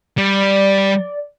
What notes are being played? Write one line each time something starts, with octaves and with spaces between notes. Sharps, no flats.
G3 D5